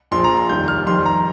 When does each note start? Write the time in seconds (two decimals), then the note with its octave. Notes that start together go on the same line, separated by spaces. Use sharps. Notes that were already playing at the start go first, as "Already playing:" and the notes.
0.11 A#1 A#2 F3 C6
0.24 A#5
0.37 C6
0.49 F1 D#2 D#3 G3 G6
0.68 F6
0.87 F2 D#3 G3 C6
1.06 A#5